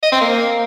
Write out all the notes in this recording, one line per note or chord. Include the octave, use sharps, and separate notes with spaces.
D#5
C4
A#3